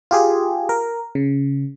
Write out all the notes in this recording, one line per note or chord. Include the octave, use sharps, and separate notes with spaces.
F4 G4 G#4
A#4
C#3